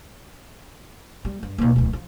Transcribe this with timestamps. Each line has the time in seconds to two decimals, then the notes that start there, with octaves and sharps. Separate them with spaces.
1.25 G3
1.43 G2
1.58 D#2 B2
1.76 D1 E2
1.93 F3